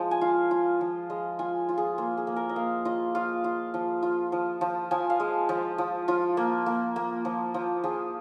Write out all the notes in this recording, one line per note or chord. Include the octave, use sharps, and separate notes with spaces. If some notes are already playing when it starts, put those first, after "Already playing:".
Already playing: F3 G#3
G#5
F4 F5
F4
F3
G#3
F4 G#5
F4
G#4
A#3 F4
G#4
A#3
A#4
D#5
A#3 F5
F4 D#5
F4 F5
F4
F3
F4
F3
F3
F3 G#5
F5
G#3
F3
F3
F3 F4
A#3
A#3
A#3
F3
F3
F3 G#4